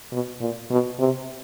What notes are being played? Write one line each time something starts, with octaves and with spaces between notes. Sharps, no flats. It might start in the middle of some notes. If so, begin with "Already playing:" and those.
B2
A#2
B2
C3